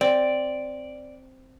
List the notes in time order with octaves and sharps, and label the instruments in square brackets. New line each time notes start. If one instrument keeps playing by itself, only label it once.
[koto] C4 [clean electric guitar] D5